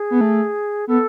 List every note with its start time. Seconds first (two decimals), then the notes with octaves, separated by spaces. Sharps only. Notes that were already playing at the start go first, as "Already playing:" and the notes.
Already playing: G#4
0.11 B3
0.21 A3
0.87 B3 A4